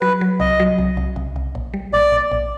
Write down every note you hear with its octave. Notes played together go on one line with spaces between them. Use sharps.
F#3 B4
F#3
C2 D#5
F#3
C2
C2
C2
C2
A#1
G3
A#1 D5
A#1
A#1